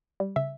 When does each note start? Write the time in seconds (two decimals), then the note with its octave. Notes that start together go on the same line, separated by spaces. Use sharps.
0.20 G3
0.36 C#3 E5